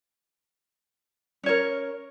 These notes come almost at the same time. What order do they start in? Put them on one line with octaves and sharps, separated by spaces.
C#4 C#5 A#4